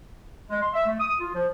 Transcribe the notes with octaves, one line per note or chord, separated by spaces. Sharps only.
G#3
C6
E5
A3
D#6
F4
F3